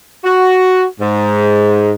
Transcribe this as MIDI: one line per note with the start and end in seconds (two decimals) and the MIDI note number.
0.23 0.85 66
1.00 1.92 44